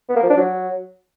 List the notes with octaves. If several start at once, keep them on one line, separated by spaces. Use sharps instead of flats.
B3
A#3
F3
D4
F#3